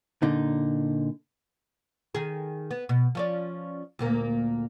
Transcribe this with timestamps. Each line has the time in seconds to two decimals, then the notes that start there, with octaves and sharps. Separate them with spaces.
0.22 A#2 D3 D#4
2.15 D#3 G#4
2.71 B3
2.89 B2
3.15 F3 C#4 D5
3.99 D2 A#2 A#3